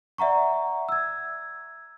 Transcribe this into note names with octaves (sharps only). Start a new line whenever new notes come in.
D5 E5 F#5 A#5 C#6
E6 G#6